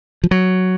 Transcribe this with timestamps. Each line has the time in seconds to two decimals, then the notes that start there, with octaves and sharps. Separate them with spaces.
0.24 F3
0.31 F#3